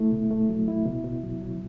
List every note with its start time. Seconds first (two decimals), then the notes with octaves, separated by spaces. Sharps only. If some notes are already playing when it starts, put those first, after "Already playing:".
Already playing: A3 E4
0.12 B2
0.30 A3
0.49 F#3
0.68 E4
0.85 B2
1.04 B2
1.23 F#3
1.42 F#3